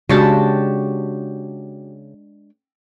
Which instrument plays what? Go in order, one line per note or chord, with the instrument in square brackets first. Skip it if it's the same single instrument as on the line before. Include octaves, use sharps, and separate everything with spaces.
[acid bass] C#3 [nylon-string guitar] G#3 D4 [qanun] F#4 G4 A5